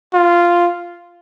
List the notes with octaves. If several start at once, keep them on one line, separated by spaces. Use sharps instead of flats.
F4